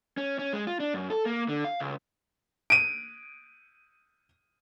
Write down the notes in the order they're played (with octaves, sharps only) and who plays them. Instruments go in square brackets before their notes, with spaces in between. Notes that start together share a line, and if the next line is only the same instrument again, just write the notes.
[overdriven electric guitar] C#4
C#4
G#3
F4
D4
F#2
A4
A#3
D3
F5
C#2
[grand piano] D7 D#7